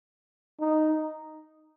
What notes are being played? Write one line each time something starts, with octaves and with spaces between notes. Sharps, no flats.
D#4